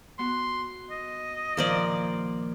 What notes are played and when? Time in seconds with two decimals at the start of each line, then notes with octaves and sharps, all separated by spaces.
0.19 B3 F#4 C6
0.90 D#5
1.57 A#2 D#3 F3 A#3 C5 D5